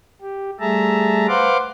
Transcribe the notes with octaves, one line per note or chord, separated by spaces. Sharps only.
G4
G3 A3 G#4 E5 A5 A#5
B4 C5 F5 F#5 C6 D6